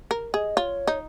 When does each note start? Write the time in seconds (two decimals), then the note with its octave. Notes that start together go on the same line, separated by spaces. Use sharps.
0.11 A#4
0.33 G#4 D#5
0.56 F4 C#5
0.87 D#4